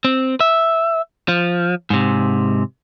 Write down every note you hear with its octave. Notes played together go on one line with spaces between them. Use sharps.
C4
E5
F3
G#2 C3